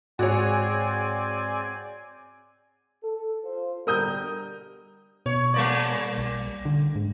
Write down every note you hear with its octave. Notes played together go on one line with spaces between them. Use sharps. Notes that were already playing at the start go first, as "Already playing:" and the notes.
G#2 C4 F#4 G#4 C#5 D5 G#5
A4
F4 C5
B2 D3 G3 A#4 D#6 G6
B2 C#5
G3 A#3 D5
B1
D3
G#2